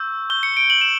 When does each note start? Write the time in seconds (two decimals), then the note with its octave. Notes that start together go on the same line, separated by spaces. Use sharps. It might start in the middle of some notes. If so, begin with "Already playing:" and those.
Already playing: C#6 E6 G6
0.30 C#6 E6 G6 G7
0.43 C#7
0.57 D7
0.70 F#7
0.81 E7